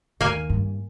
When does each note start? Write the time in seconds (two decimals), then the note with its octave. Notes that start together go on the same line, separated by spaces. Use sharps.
0.21 D#2 A#3 G#5
0.49 G2